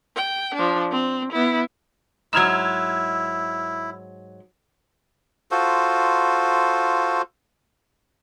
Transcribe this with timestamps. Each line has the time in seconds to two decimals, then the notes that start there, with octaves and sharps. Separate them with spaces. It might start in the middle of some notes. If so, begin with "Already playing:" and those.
0.16 G5
0.55 F3 D4
0.91 C4
1.32 B3 E4
2.33 G#2 F#3 E4 E6 F6 G#6
5.51 F4 F#4 A4 C5